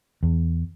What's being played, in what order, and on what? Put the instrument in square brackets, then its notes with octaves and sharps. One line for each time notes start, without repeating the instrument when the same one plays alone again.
[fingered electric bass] E2